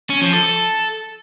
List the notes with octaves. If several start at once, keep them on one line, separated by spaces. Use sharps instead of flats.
C#4
F3
A4